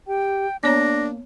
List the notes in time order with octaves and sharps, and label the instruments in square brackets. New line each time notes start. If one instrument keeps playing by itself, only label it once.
[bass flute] G4 [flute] G5
[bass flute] A#3 [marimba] B3 C#5 A#5 [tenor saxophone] D4 [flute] A#6